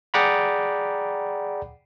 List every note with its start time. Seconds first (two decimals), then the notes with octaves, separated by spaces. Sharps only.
0.14 G#4 D5 F#5 G5 A#5 B5